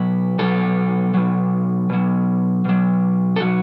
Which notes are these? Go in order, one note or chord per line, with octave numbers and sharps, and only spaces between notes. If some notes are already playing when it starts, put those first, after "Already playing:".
Already playing: B2 F#3 B4
B2 F#3 A4
B2 F#3
B2 F#3
B2 F#3
A4
B2 F#3 F#4